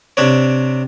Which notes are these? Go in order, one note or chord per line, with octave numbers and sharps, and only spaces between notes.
C3 D4 C#5